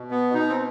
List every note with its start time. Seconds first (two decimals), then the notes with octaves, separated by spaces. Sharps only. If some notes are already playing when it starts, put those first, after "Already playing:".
Already playing: B2
0.11 B3
0.34 B2 D#4
0.49 C4